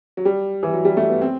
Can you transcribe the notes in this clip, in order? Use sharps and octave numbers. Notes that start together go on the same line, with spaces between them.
F#3
G3
E3
F#3
G3
A3
B3
C4